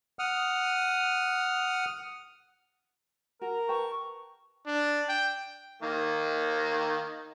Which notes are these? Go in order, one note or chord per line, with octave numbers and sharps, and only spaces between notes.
F#5 D#6 F6
F#4 A#4
B4 G5 A5 C#6
D4
G5
D#3 A#3